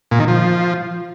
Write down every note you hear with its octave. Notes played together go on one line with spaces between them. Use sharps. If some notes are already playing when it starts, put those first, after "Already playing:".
A#2
D#3
F3